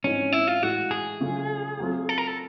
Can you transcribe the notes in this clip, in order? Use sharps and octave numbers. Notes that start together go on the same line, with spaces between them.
G#2 E3 G#3 C4 C#4 D#4
E4
F4
A2 E3 G#3 F#4
G#4
C#3 F#3 A3 C#4 F4
F#3 A3 C4 F4
A4
A#4
A4